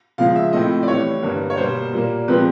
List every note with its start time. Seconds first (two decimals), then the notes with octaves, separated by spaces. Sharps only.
0.18 C#3 F3 G#3 F5
0.36 E5
0.53 A2 F3 A3 C4 D#5
0.83 D5
0.88 A2 E3 G3 C#5
1.23 G2 D3 G3 A#3
1.50 C#5
1.57 B2 G3 A#3 C5
1.92 A#2 G3 A#3
2.28 C3 F3 G#3 C4 B4